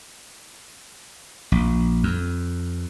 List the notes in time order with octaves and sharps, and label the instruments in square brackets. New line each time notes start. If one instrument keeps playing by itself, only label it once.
[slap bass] A#1
F2